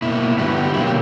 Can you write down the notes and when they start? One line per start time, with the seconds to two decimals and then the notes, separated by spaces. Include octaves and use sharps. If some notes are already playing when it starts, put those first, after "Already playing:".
0.02 B2 A#3 E4
0.37 G2 D3 G3 B3 F#4
0.56 G4
0.74 B2 F#3 A#3 E4
0.86 G4